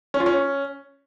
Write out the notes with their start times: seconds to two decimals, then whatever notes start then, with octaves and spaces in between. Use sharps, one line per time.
0.14 C#4
0.20 F4
0.26 C#4